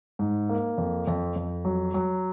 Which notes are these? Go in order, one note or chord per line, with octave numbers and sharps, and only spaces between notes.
G#2
A#3
F2
F2
F2
F#3
F#3